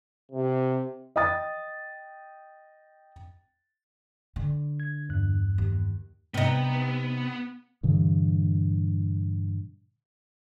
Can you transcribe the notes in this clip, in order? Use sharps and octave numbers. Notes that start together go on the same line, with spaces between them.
C3
D#5 G5 D#6 A6
D3
G#6
E2 G2 F#6
D#2
C3 B3 D#4
G2 A#2 D3 E3